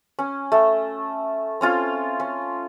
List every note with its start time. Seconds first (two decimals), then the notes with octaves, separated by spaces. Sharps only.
0.19 C#4
0.52 A3
1.61 C4 C#4 F4
2.20 C#4